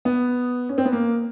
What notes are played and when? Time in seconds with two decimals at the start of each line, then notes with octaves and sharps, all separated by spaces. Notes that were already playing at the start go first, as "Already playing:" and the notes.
0.05 B3
0.69 C#4
0.78 C4
0.85 B3
0.92 A#3